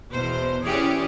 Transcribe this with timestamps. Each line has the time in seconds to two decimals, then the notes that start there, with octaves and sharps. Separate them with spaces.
0.12 E2 B2 C5
0.64 E3 C#4 G4 G#4 D5